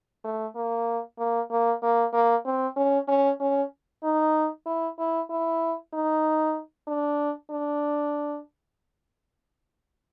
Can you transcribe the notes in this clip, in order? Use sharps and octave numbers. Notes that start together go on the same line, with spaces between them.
A3
A#3
A#3
A#3
A#3
A#3
C4
C#4
C#4
C#4
D#4
E4
E4
E4
D#4
D4
D4